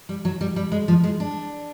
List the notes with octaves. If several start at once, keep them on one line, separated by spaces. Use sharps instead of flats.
G3
F#3
G3
G3
G#3
F3
G#3
D4